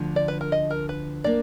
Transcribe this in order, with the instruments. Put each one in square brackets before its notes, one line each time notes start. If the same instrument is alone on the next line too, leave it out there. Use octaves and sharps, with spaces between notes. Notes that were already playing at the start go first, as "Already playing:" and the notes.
Already playing: [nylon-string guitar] D2 D3 F3
[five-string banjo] D5
B4
A#4
D#5
A#4
B4
[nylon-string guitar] A#3 D4 [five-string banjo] D5